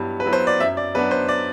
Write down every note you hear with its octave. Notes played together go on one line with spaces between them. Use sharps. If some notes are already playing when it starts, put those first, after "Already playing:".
Already playing: G2 F#3 B3 E4
B4
F#3 B3 E4
C5
D5
F#2 E5
D5
F#3 B3 D4 B4
C5
D5